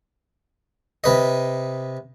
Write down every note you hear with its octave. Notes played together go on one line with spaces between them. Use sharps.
C3 B4 D#5